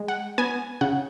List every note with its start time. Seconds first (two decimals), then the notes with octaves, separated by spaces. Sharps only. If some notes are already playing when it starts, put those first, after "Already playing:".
Already playing: G#3
0.08 F#5
0.38 B3 G#5
0.81 C#3 F#5